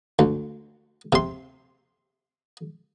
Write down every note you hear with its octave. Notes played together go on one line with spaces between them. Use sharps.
D2
C3 C6